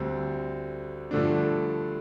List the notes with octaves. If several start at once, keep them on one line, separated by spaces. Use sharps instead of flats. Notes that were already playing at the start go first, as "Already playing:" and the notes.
Already playing: D2 D3 G3 C4
G2 D3 F3 A3 D4